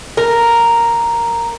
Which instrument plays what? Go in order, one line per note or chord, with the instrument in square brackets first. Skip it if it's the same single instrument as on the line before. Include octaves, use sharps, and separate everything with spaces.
[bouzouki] A#4